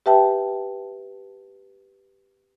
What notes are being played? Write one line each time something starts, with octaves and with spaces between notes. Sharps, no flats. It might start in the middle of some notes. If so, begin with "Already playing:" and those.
G4 B4 E5 G5 A5